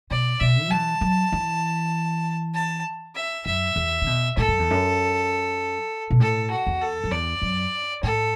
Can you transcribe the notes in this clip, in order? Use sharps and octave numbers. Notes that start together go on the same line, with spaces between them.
B2 D5
B2 E5
F#3
E3 A5
F#3
E3
A5
E5
F#2 E5
E2
D3
B2
A2 A4
F#2
E2
F#2
B2
A2 A4
F#4
E2
A4
F#2
E2 D5
F#2
A2 A4